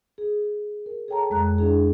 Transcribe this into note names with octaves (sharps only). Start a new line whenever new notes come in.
G#4
A#4
G#4 A4 C#5 G5 A5 A#5
F2 G#3 A#5 F#6
D4 E4 G#4